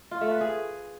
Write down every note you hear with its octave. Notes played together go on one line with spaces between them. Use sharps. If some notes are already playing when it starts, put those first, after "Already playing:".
F4
A3
B4
G#4